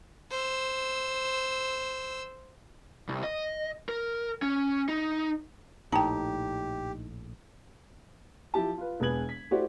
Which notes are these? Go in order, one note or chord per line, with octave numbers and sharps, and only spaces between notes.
C5 E6
C2
D#5
A#4
C#4
D#4
A#1 A2 D#4 G4 G5 A5
F3 E4 G4 A5
F4 B4
E1 B3 G#4 B4 G#6 F#7
B6
A3 E4 F#4 G4 C5 D5